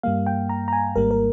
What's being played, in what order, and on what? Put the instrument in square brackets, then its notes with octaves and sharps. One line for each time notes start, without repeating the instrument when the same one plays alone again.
[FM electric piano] G2 G3 A#3 F5
G5
A#5
A#5
G#5
G#1 G#2 G3 A#3 A#4
A#4